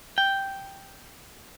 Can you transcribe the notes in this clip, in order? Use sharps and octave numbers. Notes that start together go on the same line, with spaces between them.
G5